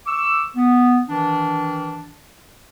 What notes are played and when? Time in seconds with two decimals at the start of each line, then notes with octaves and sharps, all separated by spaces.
0.06 C#6 D6 E6
0.56 B3
1.07 D#3 E3 D4